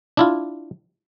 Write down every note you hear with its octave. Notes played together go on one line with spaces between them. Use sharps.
D4 E4 F4